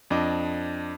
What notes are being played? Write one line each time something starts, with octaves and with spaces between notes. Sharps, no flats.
F2 D4 D#5 D6